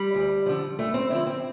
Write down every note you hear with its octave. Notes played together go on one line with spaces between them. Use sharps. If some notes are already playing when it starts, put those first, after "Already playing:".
Already playing: G3
D2
D3 F3
D2 A3
C4
D3 F3 E4
C4